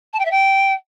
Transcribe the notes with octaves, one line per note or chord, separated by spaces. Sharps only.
A5
G5
E5
G5